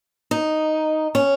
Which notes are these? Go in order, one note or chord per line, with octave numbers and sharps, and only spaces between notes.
D#4
C#4